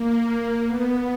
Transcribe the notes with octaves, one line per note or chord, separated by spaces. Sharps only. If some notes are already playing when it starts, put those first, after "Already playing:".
Already playing: A#3
B3